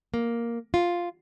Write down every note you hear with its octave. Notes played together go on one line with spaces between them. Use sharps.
A#3
F4